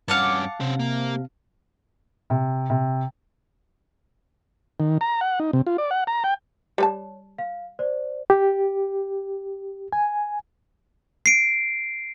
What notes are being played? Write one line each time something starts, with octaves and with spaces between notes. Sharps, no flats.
G2 C#4 F5 F#5 A5 D6
C3 C#4 C5
A#3
C3
C3
D#3
A#5
F#5
D#4
C3
F4
D5
F#5
A#5
G5
G3 B4 C#5 A5
F5
C5 D5
G4
G#5
C7 D7